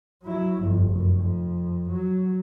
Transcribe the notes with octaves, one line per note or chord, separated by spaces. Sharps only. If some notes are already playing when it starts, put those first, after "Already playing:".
F#3 E4
G1 F2
F1 F#2
F2
F#3